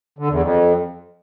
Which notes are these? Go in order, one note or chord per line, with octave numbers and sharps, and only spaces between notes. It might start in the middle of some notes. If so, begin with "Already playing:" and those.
D3
E2
F2